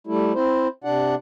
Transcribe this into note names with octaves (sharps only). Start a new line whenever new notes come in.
G3 A3 E4
C4 E4 C5
C3 D4 D5 F#5